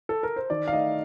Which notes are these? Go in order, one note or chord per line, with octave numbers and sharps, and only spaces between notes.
A4
A#4
C5
D#3 D5
F5
A3 D#4 D#5